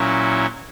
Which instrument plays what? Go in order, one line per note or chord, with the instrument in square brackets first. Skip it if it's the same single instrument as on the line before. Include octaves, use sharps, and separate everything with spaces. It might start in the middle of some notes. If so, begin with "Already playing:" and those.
Already playing: [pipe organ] A#2 F#3 C#4 E4